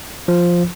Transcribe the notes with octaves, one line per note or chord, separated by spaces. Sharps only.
F3